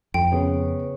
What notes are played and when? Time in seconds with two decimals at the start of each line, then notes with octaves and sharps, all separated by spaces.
0.14 F2 G5
0.32 C#3 B3